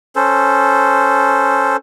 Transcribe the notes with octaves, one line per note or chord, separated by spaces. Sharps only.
C#4 A4 C5